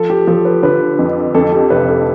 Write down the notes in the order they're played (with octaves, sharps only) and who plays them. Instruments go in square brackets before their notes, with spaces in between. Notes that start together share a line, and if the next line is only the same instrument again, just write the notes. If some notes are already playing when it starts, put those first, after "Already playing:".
Already playing: [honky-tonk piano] F3 [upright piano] A4
[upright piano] G4
[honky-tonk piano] F3 [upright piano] A4
[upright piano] B4
[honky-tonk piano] D3 [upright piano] B4
[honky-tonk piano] F2
[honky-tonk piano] F2 [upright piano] A4
[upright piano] G4
[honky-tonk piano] F1 [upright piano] B4
[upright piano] A4